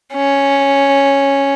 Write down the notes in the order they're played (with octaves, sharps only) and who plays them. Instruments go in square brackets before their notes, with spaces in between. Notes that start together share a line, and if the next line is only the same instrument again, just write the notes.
[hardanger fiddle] C#4